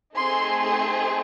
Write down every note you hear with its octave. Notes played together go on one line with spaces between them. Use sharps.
A3 C4 D#4 G#4 C6
C6